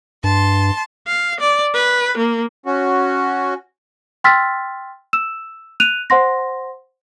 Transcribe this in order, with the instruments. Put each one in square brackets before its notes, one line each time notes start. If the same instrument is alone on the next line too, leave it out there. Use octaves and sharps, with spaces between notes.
[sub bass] G2 [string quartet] A5 C6
[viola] F5
D5
B4
A#3
[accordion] C#4 F#4
[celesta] G5 C6 E6 F6 A6 B6
E6 E7
F#6 D#7 F7
C5 F#5 C6 A#6